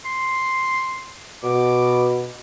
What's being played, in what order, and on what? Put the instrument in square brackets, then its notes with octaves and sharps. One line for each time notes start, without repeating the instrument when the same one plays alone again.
[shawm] C6
[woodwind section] B2 [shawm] D6